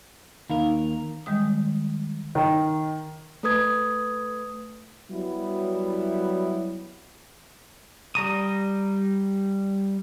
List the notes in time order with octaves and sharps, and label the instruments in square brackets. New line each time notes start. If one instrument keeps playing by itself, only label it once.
[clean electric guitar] D#2 A#4 [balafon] D#4 F5
[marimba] D#3 G3 G#3 D#6
[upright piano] D#3
[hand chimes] A3 A4 B4 D#6 G#6
[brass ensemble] F#3 G3 B3 E4
[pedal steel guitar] G3 A#5 D#6